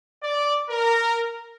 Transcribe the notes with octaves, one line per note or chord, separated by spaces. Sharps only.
D5
A#4